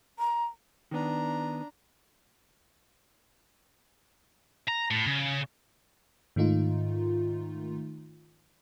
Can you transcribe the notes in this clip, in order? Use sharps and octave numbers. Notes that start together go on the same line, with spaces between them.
A#5
D#3 B3 D4 A#5
A#5
A2
C#3
G#2 D#3 A3 D#4 F4